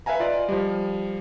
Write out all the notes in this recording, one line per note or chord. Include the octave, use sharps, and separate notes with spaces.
B4 E5 F5 G#5 A#5
F4 D5 D#5
F3 G3